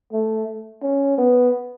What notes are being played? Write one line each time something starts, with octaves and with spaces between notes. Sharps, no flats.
A3
C#4
B3